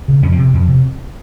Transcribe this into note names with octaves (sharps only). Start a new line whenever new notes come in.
C#3
F2 C#4
C4
C3
F2
C3